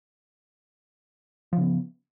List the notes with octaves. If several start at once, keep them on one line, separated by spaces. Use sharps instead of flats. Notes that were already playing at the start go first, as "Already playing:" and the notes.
C#3 F3 B3